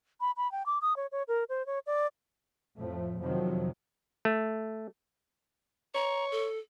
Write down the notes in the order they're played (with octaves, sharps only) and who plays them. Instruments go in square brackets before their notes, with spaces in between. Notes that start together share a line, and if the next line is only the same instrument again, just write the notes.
[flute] B5
B5
G5
D6
D#6
C#5
C#5
A#4
C5
C#5
D5
[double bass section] F2 A2 F3 A3
F2 C3 D#3 F3 F#3
[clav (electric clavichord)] A3
[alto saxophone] C#5 [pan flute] A#5
[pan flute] A4